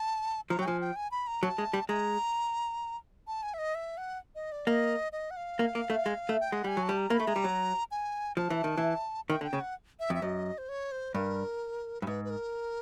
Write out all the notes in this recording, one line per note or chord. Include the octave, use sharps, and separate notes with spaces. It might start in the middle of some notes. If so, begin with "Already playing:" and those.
Already playing: A5
F3 A#5
F#3 G5
F3 G#5
G5
G#5
B5
A#5
F#3 A5
G#3
G3
G#3 A#5
A5
G#5
E5
D#5
E5
F#5
D#5
D5
A#3 D#5
D#5
F#5
F5
A#3
A#3
A3
G#3
A3
G5
G#3 F#5
G3 G#5
F#3
A5
G3
A#5
A#3
B5
A3
G#3 A#5
G3
F#3
G#5
F3 A5
E3
D#3
E3
D#3 G5
D3
G5
C#3
F#5
E5
F2 E5
F#2 D#5
C5
C#5
C5
G2 A#4
G2
G#2 B4
B4
A#4